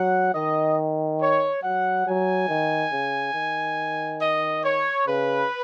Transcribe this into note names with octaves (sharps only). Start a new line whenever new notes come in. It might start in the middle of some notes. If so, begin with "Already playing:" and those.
Already playing: F#3 F#5
D#3 D#5
C#5
F#3 F#5
F#3 G#5
D#3
C#3
D#3
D#5
C#5
C#3 B4